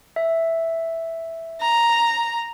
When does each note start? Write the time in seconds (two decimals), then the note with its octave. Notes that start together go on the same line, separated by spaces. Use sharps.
0.16 E5
1.61 A#5